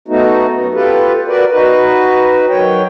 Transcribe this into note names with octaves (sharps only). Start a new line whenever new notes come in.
A3 B3 D#4 F#4
F#2 B3
F4 G4 A4 B4
F#4 A#4 B4 D5
D#4 F#4 B4
D#3 F#3 C#5 G5